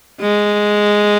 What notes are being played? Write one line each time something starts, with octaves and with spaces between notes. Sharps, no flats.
G#3